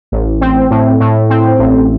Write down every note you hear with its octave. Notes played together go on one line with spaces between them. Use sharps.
A1
C4
A2
A2
C4
A1